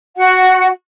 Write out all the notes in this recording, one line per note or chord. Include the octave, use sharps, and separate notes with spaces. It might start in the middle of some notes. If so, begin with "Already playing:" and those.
F#4 F#5